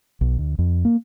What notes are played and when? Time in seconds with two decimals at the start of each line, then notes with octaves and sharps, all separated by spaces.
0.21 B1
0.38 D2
0.59 F2
0.85 A#3